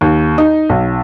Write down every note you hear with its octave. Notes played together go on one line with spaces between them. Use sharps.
D#2
D#4
B1